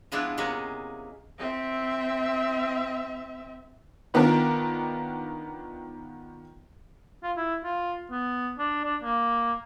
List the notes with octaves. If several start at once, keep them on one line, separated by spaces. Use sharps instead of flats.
F3 G#3 B3 D4 E4 F4
C3 G#3 A#3 B3 C#4
C4 E5
D#3 B3 D4 F4 A#4
F4
E4
F4
B3
D4
D4
A#3